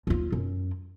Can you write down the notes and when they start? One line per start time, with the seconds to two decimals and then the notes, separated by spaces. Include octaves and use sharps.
0.07 D#2 F4
0.32 F#2